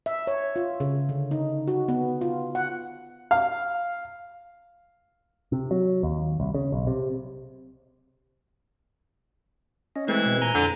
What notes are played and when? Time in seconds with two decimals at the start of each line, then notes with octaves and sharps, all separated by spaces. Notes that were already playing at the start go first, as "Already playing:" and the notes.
0.06 E5
0.27 C#5
0.56 F4
0.80 C#3
1.09 D3
1.31 D#4
1.68 F#4
1.88 B3
2.21 F4
2.55 F#5
3.31 F5
5.52 C3
5.71 F#3
6.03 D#2
6.40 C2
6.54 C#3
6.72 B1
6.87 C3
9.96 C#4 D#5
10.08 E3 G#3 A3 C4 G#6
10.26 B2
10.42 A#2 G#5 A#5 G6
10.55 F2 D3